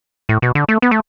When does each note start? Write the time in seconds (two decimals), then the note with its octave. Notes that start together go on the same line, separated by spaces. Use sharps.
0.29 A2
0.42 B2
0.55 D3
0.68 A3
0.82 B3
0.91 A3